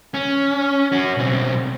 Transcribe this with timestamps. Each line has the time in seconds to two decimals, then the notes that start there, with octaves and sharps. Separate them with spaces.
0.14 C#4
0.92 C#4 F#4
1.17 B1 C4